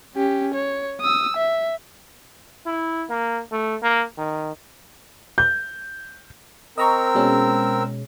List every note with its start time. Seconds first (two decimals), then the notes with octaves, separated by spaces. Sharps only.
0.16 C#4 G4
0.54 C#5
1.01 D#6 E6
1.36 E5
2.66 E4
3.09 A#3
3.52 A3
3.82 A#3
4.18 D#3
5.38 G6
6.78 C4 A#4 D#5 A#5 C#6 E6
7.15 B2 G#3 C#4